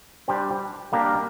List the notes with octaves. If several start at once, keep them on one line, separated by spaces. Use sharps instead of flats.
G3 D4 G4 C5
G3 A#3 D4 G4 A#4